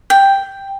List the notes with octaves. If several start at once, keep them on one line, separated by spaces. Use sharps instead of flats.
G5